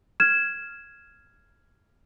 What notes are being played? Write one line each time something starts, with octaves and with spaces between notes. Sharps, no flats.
F6 G#6 E7